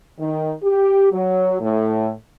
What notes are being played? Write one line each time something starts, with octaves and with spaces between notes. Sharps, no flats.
D#3
G4
F#3
A2